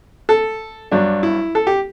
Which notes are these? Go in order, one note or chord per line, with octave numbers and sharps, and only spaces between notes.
A4
G2 F#3 D4
E4
A4
G4